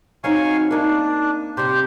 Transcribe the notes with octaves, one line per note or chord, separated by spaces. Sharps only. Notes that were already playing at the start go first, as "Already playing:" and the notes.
F#3 C4 D#4 F5 G#5 C#6
A#3 D4 D#4
C3 G3 G4 C5